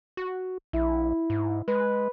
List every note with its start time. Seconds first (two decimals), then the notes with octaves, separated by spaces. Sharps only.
0.17 F#4
0.73 A#1 E4
1.30 G#2
1.68 G#3 B4